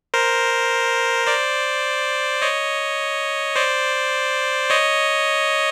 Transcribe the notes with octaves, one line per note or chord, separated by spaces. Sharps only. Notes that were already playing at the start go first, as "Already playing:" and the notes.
A#4 C5
C5 D5
C#5 D#5
C5 D5
C#5 D#5